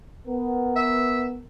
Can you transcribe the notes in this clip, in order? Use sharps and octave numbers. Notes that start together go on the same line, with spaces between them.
B3 A#4
E5